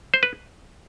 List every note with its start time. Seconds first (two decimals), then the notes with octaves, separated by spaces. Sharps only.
0.14 C5
0.23 B4